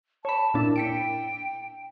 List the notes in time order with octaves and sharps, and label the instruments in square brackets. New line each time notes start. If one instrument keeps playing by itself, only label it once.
[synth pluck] C#5 B5 [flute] A5
[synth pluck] A#2 D4 E4 [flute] A5
[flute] G5 [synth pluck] B6 C#7 D7